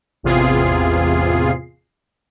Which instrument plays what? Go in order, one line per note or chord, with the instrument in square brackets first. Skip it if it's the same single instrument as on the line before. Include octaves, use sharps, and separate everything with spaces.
[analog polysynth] A1 E2 C3 F4 G#4 C7